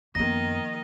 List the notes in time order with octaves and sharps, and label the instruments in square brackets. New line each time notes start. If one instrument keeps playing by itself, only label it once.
[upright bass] F#2 B3 [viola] D#3 D#5 [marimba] F3 A#3 [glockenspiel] A#6